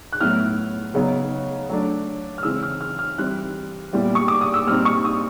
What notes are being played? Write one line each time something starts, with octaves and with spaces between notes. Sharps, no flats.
F#6
A2 F#3 B3 E4 F6
C#3 F#3 B3 D#4
F#3 A3 D4
F6
C#3 E3 G#3 C4 E6
F6
F6
F6
E3 G3 C4 E4 F#6
A#2 G3 B3 E4
C#6
D6
D#6
E6
A#2 G3 C4 D#4 F6
C#6
D#6